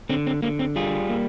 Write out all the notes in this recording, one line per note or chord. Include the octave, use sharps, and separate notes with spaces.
D3 C4
C4
D3 A#3
C4
G3 F4 G#4
A#3